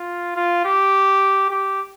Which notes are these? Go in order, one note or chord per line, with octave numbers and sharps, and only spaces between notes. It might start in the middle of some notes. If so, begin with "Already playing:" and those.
Already playing: F4
F4
G4
G4